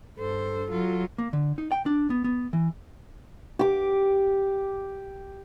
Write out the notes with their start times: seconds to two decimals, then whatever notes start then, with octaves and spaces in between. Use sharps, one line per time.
0.17 G2 A4 C5
0.70 F#3 F4
1.18 A#3
1.33 D3
1.58 D#4
1.72 G5
1.86 D4
2.10 B3
2.24 B3
2.53 E3
3.59 G4 D6